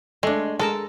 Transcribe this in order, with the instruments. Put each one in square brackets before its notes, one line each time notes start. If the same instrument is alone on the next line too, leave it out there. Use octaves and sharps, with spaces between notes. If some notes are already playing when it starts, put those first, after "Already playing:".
[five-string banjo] G#3 [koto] A3 D4
[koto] G#3 A#4 A5 [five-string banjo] A4